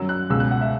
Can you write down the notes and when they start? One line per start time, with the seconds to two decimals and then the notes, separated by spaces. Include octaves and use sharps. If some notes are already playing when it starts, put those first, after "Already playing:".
Already playing: F#2 F#3 E6
0.09 F#6
0.30 C#2 B2 G#3 E6
0.40 F#6
0.51 F#5
0.61 E5